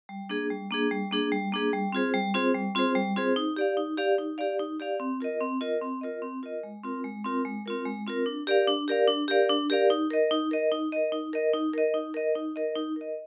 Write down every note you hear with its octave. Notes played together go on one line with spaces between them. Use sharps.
G3
A#3 D4 G#4
G3
A#3 D4 G#4
G3
A#3 D4 G#4
G3
A#3 D4 G#4
G3
C4 F4 G#4 C5
G3
C4 F4 G#4 C5
G3
C4 F4 G#4 C5
G3
C4 F4 G#4 C5
D#4
G4 D5 F5
D#4
G4 D5 F5
D#4
G4 D5 F5
D#4
G4 D5 F5
C4
F4 A#4 D#5
C4
F4 A#4 D#5
C4
F4 A#4 D#5
C4
F4 A#4 D#5
G#3
C4 F4 A#4
G#3
C4 F4 A#4
G#3
C4 F4 A#4
G#3
C4 F4 A#4
D4
G4 A#4 D5 F5
D4
G4 A#4 D5 F5
D4
G4 A#4 D5 F5
D4
G4 A#4 D5 F5
D#4
A#4 D#5
D#4
A#4 D#5
D#4
A#4 D#5
D#4
A#4 D#5
D#4
A#4 D#5
D#4
A#4 D#5
D#4
A#4 D#5
D#4
A#4 D#5